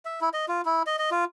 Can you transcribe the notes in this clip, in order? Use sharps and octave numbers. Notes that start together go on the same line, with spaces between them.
E5
E4
D#5
F4
E4
D#5
D#5
F4